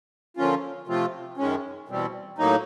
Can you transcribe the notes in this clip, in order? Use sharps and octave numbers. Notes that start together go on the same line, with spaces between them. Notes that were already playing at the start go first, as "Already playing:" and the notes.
D3 F3 A#3 C#4 F4
C3 F3 A3 C4 F4
F#2 D#3 G#3 C#4
E2 B2 G3 C4
A2 F#3 A#3 D#4